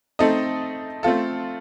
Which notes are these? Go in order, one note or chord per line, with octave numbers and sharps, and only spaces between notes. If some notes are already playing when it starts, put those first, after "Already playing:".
A3 C4 D#4 A4 D#5
A3 C4 F4 A4